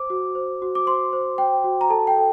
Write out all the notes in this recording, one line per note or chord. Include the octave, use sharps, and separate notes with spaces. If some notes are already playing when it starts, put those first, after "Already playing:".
Already playing: C5 D6
F#4
C5
F#4
D6
C5 C6
C5
C5 G5
F#4
A#5
A4 A5
G5
A4